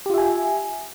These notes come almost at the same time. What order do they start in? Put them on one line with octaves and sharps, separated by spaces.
G4 F4 E5 G#5